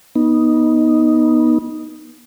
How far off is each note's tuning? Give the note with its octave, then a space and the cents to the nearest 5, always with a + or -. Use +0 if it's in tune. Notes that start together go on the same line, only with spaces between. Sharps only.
B3 -25 D#4 +0